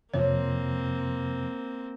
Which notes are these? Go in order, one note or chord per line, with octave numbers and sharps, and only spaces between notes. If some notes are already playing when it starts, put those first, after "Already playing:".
F2 C3 F3 A#3 C4 C#5